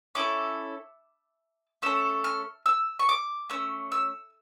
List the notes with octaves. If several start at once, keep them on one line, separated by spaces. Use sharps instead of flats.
C#4 E4 A4 D6
A3 C#4 A4 E6
F6
E6
C#6
D6
A3 C#4 E6
E6